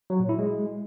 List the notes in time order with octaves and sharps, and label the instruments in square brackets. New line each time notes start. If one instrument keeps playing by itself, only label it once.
[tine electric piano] F#3
A#2
E4
G#3